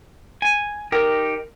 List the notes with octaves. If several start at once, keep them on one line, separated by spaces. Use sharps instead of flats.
G#5
D#4 G4 A#4